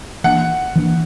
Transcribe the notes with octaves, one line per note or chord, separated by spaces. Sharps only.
E3 A#3 D4 F#5
E3 A#3 D4